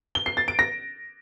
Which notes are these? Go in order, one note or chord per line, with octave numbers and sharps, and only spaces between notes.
G7
C7
A6
D7
A#6